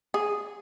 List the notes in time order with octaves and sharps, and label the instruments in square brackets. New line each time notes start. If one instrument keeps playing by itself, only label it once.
[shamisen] G#4